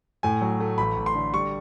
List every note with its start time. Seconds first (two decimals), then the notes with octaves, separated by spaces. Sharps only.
0.23 A2 G#5
0.41 F#3
0.60 A3
0.78 A1 B5
0.96 A1
1.06 C6
1.15 D3
1.33 G3 C#6